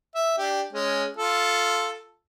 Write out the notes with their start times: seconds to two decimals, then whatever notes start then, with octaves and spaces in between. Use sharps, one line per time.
0.15 E5
0.38 D4 G4
0.73 G#3 C#4
1.17 F4 A4